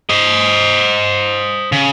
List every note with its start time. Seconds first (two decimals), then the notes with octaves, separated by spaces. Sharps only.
0.10 C5 D#5
1.72 C#3